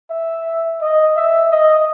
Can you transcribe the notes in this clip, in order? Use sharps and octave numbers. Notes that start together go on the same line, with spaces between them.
E5
D#5
E5
D#5